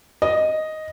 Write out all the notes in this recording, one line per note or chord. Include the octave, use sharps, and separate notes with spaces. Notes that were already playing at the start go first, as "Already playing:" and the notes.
D#5